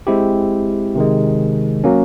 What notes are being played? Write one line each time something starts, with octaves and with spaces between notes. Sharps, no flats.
G#3 C4 E4 G4
C3 D#3 G#3
F#3 A#3 C#4